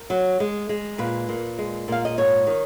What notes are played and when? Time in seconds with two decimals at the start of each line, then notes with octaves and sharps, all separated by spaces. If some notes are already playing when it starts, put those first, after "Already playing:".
Already playing: A#4
0.10 F#3
0.40 G#3
0.69 G#3
0.98 A#2 B4
1.29 A#2
1.59 G#3
1.88 A#2 F5
2.05 D#5
2.18 G#2 C#5
2.47 D#3